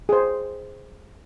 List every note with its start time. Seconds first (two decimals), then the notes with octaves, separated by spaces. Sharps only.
0.09 G#4 C5